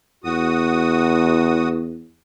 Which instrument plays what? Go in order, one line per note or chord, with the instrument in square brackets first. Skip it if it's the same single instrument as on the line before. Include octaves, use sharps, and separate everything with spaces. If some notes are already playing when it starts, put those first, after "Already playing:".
[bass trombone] E2 [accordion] F#4 D#6